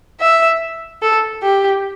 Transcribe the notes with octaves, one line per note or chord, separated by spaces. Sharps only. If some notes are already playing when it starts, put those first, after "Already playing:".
E5
A4
G4